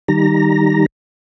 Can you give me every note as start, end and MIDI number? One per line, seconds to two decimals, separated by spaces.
0.08 0.86 51
0.08 0.86 55
0.08 0.86 63
0.08 0.86 67
0.08 0.86 82
0.08 0.86 94